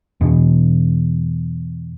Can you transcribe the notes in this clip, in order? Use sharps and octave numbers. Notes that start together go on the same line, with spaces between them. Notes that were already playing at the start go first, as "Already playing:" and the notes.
E2 B2